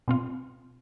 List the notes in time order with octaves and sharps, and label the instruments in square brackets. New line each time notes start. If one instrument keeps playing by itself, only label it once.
[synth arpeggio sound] B2 C4 F4